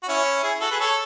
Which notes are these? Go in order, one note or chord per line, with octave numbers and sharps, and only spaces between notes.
F#4
C#4 E4
E4 G#4
F#4 A4
G#4 B4
A4 C#5